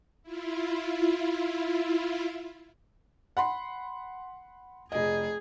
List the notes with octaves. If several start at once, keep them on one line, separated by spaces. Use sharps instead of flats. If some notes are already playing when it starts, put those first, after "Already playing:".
E4 F4
F#5 B5 C6
F1 G#4 D#5